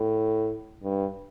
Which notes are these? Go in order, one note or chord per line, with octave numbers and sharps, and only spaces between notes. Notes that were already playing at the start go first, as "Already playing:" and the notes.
Already playing: A2
G2